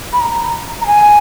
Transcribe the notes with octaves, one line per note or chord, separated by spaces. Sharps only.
B5
A#5
A#5
G#5